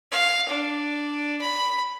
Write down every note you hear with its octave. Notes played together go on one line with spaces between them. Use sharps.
F5
D4
B5